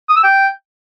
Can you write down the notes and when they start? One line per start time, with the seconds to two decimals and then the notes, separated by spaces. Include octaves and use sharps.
0.09 D#6
0.16 E6
0.24 G5